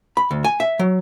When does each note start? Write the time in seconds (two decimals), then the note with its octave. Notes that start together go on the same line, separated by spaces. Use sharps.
0.17 B5
0.31 D2
0.44 G#5
0.60 E5
0.79 F#3